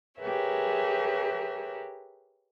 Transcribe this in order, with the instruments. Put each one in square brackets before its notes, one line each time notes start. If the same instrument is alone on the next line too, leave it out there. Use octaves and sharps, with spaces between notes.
[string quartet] G4 G#4 A#4 B4 C#5 E5